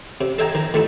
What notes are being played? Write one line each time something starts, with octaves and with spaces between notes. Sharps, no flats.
C3
A4 D#5 E5 G5 G#5 A#5
D#3 A#5
D#3 A3 D#4 E4